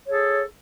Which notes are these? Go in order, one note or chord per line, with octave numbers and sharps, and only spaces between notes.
G#4 A4 C#5